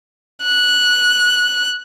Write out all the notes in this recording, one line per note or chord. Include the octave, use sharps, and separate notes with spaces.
F#6